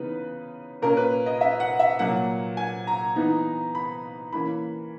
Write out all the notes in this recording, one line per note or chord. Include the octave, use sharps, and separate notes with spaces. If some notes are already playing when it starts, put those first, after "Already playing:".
Already playing: C#3 E3 B3 D#4 B4
A#2 A#3 C#4 A#4
B4
D#5
E5
F#5
E5
A#2 F#3 A#3 F#5
G#5
A#5
E3 B3 D#4
B5
E3 A#3 C#4 B5